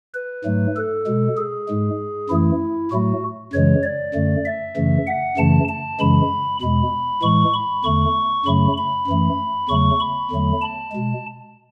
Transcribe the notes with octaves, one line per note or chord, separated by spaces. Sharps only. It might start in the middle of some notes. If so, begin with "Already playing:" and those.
B4
G#2 F#3 A3
A4
B2 G#3
G#4
G#2 G#3
F#2 E3 A3 E4
A2 F#3 A3 F#4
F#2 C#3 E3 G#3 C#5
D5
F#2 D3 A3
E5
F#2 C#3 E3 A3
F#5
F#2 C#3 E3 A3 A5
A5
F#2 C#3 E3 G#3 B5
E2 B2 G#3 B5
A2 E3 G#3 C#6
B5
E2 D3 A3 C#6
F#2 C#3 F#3 A3 B5
B5
F#2 E3 A3
E2 C#3 F#3 A3 C#6
B5
E2 D3 F#3 A3
A5
B2 G#3